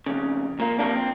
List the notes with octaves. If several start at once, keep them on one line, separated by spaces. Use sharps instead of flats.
F2 C#3
A#2 A#3
C3 F3 A#3 D4
C4